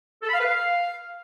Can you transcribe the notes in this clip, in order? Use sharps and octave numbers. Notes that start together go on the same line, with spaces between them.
A4
B5
F5
B4
F5